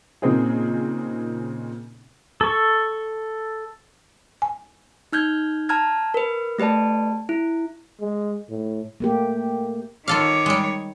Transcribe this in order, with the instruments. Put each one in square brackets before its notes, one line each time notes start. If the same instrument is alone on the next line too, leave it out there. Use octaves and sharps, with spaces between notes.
[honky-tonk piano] A#2 C#3 A#3 C4 D#4 G#4
[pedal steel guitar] A4 C#6
[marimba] G#5
[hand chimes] D#4 F6 G6 G#6
A5 A#5 F6 G#6
A#4 B4
A3 G4 B4 D5 A5
E4
[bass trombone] G#3
A2
[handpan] A3 A#3 G4
[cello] D#3 C#5 [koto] F4 A4 F5 [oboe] D6
[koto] G3 G#3